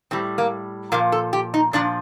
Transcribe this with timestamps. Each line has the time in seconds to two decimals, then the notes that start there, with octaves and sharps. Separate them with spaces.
0.11 A2 G3 C4
0.38 A#3
0.92 A#2 F3 A#3
1.12 A4
1.33 G4
1.54 D#4
1.73 A#2 F3 D4